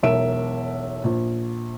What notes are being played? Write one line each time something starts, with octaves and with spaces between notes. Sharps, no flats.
E1 B1 A#4 E5 D7 E7
A#1